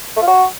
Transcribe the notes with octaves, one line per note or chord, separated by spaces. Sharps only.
A3
F4
F#4